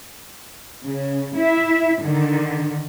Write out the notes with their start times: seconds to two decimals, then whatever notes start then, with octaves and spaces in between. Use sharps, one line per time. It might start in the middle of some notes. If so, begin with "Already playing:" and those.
0.84 C#3
1.35 E4 E5
2.01 D3 D#3